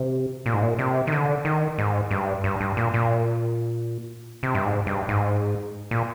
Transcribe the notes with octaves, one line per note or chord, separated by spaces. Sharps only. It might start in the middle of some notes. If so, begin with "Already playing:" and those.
Already playing: C3
A#2
G#2
A#2
C3
D#3
D3
D#3
G#2
G2
G2
G2
A#2
A#2
C3
G2
G#2
G2
G#2
A#2